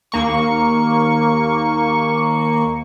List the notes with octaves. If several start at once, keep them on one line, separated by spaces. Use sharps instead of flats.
D#2 A#3 C#6